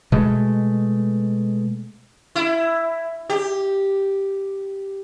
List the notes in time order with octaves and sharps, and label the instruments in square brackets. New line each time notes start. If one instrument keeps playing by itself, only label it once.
[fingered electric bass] B2 G#3 A3
[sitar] E4
G4